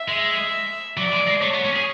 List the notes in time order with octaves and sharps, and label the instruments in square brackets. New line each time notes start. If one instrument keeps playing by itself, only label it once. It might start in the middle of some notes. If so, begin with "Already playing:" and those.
Already playing: [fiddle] E5
[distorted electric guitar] G#3
[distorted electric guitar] F#3 [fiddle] D5
[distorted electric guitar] G#3
G#3
[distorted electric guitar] A3 [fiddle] C#5
[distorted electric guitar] B3
C#4
G#4